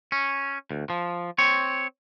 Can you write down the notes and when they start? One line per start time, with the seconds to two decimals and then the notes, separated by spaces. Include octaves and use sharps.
0.12 C#4
0.71 D2
0.90 F3
1.38 C4 C#5